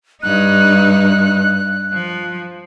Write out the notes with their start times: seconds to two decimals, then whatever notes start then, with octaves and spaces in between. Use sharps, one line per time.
0.23 G2 D#4 F#6
1.93 F3